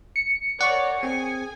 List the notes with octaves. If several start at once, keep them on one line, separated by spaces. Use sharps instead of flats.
C#7
A#4 C#5 D5 F#5 C#6
C4 G#4 G#5